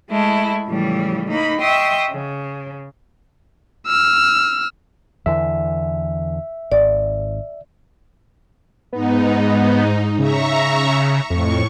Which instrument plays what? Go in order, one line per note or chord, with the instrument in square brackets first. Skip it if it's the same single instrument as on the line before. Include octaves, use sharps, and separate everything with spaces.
[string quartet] G#3 A3 E4
A2 C#3 E3 F3 G3
A#3 D#4 B5
D#5 E5 G5 C6 C#6 D#6
C#3
[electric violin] E6 F6
[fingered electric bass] E2 D3 E3 [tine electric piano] E5
[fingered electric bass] G#1 [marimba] D5
[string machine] G#2 D#4 [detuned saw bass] B3
[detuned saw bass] C#3 [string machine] E5 A#5 C#6
[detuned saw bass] F2 [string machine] A2 C#6